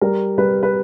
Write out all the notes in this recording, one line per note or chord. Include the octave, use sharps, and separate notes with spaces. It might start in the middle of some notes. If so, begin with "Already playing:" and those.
G3 A#4
G3 B4
B4